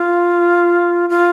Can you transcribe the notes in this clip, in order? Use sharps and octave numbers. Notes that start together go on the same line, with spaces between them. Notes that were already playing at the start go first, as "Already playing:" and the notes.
Already playing: F4
F4